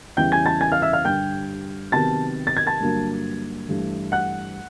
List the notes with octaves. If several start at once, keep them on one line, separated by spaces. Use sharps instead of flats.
E2 C#3 E3 G3 G5 G6
G#5 G#6
A5 A6
G#5 G#6
F5 F6
E5 E6
F5 F6
G2 D3 G3 G5 G6
C3 D#3 F#3 B3 A5 A6
A6
G#6
A5 A6
G2 D3 F#3 A#3
G2 E3 A3
F#5 F#6